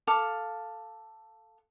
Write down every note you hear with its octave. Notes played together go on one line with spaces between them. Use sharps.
A4 F5 D6